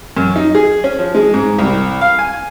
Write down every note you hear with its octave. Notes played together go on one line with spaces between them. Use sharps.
F#2
D#4
G#4
C#4
F3
G#3
G#2
C2
F5
G#5